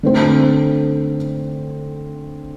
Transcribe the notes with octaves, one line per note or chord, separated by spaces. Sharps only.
D3 A3 C4